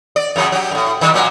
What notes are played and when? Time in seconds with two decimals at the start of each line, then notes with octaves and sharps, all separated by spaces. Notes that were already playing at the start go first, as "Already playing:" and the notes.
0.16 D5
0.36 F#2 C#3 F#3
0.52 F#3 G4
0.71 F#2 A2
1.01 D#3 G3
1.14 A#2 F#3